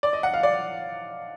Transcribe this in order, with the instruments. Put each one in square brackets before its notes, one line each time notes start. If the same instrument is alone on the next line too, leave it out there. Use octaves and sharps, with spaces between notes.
[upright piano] D5
D#5
F#5
F5
D5